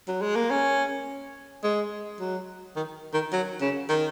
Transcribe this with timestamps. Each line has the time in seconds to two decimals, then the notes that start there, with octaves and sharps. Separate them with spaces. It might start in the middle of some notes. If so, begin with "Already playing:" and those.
0.08 F#3
0.22 G#3
0.36 A#3
0.51 C#4
1.64 G#3
2.20 F#3
2.76 D#3
3.14 D#3
3.33 F#3
3.61 C#3
3.89 D#3